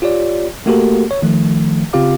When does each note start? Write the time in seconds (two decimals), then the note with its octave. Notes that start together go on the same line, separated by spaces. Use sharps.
0.02 F4 G4 C#5 D5
0.66 A3 A#3 F#4 G4 A4 A#4
1.11 C#5
1.22 D#3 F3 A3
1.93 C#3 C4 F4 G4 F5 D6